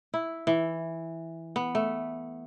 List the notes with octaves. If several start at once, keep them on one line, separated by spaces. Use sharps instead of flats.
E4
E3
B3
A3